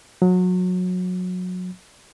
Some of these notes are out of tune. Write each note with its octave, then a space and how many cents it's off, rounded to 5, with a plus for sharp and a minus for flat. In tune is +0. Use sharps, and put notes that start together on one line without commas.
F#3 -25